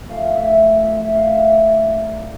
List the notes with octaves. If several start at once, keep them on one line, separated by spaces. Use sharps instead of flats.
A2 F3 A3 C#4 F5
E5
E5
F5
E5
D5
D5
C#5
A#4